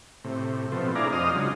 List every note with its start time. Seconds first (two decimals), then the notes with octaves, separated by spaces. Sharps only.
0.24 A2 C3
0.72 B2 F3 A3 C4
0.95 D4 E4 G#4 D5 F5 A#5
1.13 F2 C5 D#5 D#6 F6
1.35 C#3 F#3 G#3 D4 F4